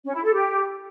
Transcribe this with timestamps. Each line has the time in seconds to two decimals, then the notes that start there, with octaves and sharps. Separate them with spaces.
0.04 C#4
0.13 E4
0.23 A4
0.33 G4